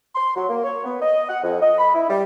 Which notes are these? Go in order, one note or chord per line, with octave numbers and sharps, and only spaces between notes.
C6
F#3
A#3
C#5
B3
D#5
F#5
F2
D#5
B5
E4
G3